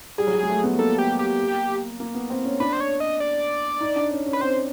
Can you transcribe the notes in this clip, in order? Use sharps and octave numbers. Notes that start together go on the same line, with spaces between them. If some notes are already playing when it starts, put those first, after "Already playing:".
G3 G#4
F#3
G3
G#3
A3
B3
A#3 A4
G4
G4
A#3
B3
C4
C#4
D4 B4
C5
C#5
D#5
D5
D#4
D4
C#4
C#4
B4
C4 C5